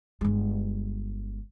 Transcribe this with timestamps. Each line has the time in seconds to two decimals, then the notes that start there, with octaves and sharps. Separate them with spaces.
0.21 G1 G#3